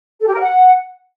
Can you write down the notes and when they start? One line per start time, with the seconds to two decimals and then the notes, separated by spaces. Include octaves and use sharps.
0.20 A4
0.27 G4
0.33 A#4
0.40 F#5